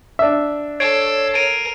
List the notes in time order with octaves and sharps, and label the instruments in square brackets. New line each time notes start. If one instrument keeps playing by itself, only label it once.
[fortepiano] D4 E5
[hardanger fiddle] A4 [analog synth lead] C#5 [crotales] G#6 C7 D7
[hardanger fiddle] A#4 [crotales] D7 D#7